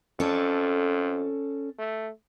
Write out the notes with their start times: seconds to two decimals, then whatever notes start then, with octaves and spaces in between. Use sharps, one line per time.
0.20 F2 C#4 A4 D5
1.79 A3